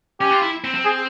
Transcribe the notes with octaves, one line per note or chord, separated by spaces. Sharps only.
C#4 G4
F4
E4
C4
C4
G#4